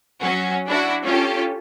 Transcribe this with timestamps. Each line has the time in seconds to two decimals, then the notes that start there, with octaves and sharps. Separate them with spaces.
0.20 F#3 C#4 F#4
0.67 D4 E4 F#4
1.06 C#4 F4 G4 A4